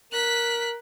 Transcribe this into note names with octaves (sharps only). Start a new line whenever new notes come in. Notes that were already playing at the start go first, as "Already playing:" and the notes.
A#4 F#6 B6